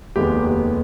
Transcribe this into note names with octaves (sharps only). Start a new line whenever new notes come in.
F1 D#2 D#3 G#3 B3 G4